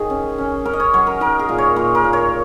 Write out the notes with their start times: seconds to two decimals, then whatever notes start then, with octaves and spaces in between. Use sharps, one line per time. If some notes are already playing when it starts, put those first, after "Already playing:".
Already playing: D#3 G#4 C#5 D#5
0.10 C#4
0.38 C#4
0.65 C#4 A#4
0.73 D#5
0.80 C#5
0.94 F#3 C#5
1.07 A#4
1.20 D#4 A#4
1.39 G#4
1.49 A#2
1.58 C#5
1.76 A#2 A#4
1.95 A#4
2.04 A#2
2.13 C#5